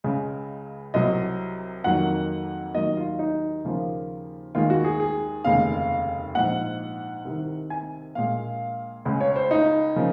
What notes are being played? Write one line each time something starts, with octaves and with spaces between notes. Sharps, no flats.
C#2 C#3 G#3
C2 C3 F#3 D#5
F2 D#3 F#3 A#3 F#5
D#2 D#3 F#3 D#5
F4
D#4
D#2 C#3 F3 A#3 F4
D#2 D#3 G#3 F4
F#4
G#4
G#4
F1 D#2 C#3 G#3 F5
A#1 G#2 F3 F#5
C2 C3 D#3
G#5
A#1 A#2 G#3 F5
C#2 C#3 G#3
C#5
C5
D#4
C#3 F3 A#3